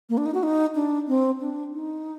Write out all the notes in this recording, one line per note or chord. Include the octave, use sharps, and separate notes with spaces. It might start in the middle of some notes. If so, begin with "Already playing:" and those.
A#3
D4
D#4
F#4
D#4
D4
C4
D4
D#4